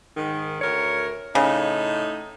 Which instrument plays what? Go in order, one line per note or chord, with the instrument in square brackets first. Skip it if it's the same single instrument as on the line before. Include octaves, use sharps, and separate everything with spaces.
[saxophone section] G#2 D#3
D2 A#4 C#5
[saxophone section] A2 D#4 [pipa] C#3